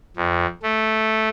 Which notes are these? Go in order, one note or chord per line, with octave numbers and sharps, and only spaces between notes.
F2
A3